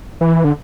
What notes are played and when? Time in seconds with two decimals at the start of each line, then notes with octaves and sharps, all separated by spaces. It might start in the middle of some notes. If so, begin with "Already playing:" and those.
0.21 E3
0.44 D3